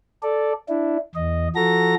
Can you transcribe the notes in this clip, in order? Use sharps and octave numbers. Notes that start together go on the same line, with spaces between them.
A4 D5
D4 E4
E2 D#5
F3 F#4 A4 A#5 A#6